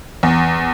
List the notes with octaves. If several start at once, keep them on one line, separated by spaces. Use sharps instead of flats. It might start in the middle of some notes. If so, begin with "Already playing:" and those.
E2